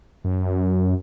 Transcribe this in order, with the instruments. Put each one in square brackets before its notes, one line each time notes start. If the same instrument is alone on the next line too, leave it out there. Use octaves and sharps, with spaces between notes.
[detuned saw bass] F#2